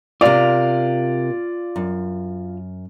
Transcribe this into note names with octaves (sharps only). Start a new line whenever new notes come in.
C3 F4 A#4 D5 F5
F#2